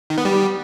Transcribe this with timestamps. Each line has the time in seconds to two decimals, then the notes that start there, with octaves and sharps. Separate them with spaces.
0.10 D#3
0.18 B3
0.25 G3